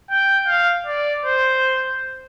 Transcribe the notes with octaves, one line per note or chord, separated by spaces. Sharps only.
G5
F5
D5
C5